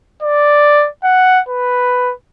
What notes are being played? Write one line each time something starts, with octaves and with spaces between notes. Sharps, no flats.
D5
F#5
B4